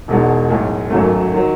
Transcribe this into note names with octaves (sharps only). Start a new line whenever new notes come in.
E1 E2 B2 G#3 D#4
B1 A2 G#3
G#1 F#2 D#3 F#3 A3
D#3 F#3